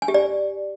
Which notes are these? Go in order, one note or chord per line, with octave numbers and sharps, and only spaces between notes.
G#5
G4
D5